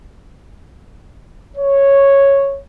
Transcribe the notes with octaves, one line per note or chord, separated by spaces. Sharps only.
C#5